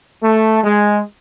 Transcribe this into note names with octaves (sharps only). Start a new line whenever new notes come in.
A3
G#3